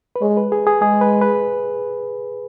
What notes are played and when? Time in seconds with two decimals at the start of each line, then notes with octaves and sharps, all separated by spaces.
0.16 B4
0.21 G#3 C#5
0.37 B4
0.52 G#4
0.67 G#4
0.81 G#3 G#4
1.01 B4
1.21 B4